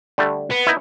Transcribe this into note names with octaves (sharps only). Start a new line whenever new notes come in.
D3 G3 A3
B3
D#4 E4